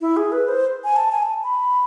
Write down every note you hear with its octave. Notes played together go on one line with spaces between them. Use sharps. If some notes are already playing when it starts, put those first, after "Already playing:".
E4
G#4
B4
C5
G#5
A5
G#5
A5
B5